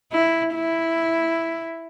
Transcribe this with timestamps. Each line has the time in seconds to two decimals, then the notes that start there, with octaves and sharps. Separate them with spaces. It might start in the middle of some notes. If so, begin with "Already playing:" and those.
0.12 E4
0.54 E4